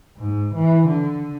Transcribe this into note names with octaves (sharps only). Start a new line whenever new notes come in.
G#2
E3
D3